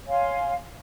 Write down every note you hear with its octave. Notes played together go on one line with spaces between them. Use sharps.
C#5 F5 G#5 C6